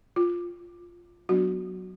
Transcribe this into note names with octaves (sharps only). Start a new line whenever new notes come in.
F4
F#3 B3 D4 F#4